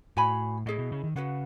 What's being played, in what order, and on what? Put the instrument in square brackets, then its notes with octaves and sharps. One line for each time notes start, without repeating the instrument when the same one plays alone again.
[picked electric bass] A2 [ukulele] F#4 C#5 G#5 B5
[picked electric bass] A2 [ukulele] E4 G#4 D#5
[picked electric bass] B2
C#3
D#3
[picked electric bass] C#3 [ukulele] F#4 B4 F#5